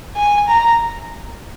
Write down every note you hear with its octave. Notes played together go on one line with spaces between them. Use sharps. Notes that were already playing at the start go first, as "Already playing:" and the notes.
G#5
A#5